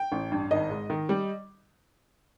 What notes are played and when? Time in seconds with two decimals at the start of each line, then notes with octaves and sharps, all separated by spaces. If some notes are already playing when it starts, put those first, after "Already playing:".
Already playing: G5
0.12 A1
0.32 G2
0.51 G#1 D#5
0.70 G#2
0.90 D#3
1.09 G3